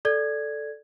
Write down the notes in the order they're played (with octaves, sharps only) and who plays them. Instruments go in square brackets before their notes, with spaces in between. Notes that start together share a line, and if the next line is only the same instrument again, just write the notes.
[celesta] A4 D5 G#6